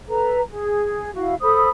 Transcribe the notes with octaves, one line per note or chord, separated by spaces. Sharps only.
A4 B4 A#5
G#4
E4 F#4 F5
A4 C5 B5 D#6